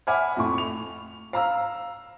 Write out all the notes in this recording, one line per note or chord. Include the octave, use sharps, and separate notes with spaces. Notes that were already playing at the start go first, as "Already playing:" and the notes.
E5 F#5 G#5 B5 D6 F6
F2 A2 C#6
F7
F5 A#5 E6